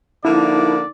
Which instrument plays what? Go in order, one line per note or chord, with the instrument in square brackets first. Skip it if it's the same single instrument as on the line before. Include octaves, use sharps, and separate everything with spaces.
[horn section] D3 F3 A#3 [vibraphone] D#4 A#4 A5 [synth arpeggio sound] E4 [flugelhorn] D5